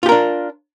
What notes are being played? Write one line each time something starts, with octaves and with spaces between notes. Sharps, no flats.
D4 F4 G4 A#4